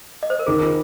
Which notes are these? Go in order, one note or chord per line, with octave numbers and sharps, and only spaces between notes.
D#5
C5
A#4
D#3 G#4
F4